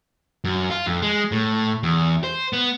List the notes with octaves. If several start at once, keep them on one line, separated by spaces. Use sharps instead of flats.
F#2
F4
F2
G#3
A2
E2
C5
B3